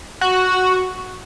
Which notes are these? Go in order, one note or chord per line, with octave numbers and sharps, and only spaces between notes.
F#4